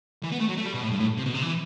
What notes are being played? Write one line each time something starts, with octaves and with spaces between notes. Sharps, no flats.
E3
B3
A3
F#3
A3
G3
B2
A2
G2
A2
C3
B2
C3
E3